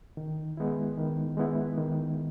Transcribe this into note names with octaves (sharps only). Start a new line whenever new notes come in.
D#3
G#3 B3 E4
D#3
G#3 B3 E4
D#3